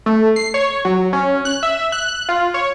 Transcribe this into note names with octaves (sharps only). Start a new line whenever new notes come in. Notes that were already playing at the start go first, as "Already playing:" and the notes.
A3
C7
C#5
F#3
C#4
F#6
E5
F#6
F4
C#5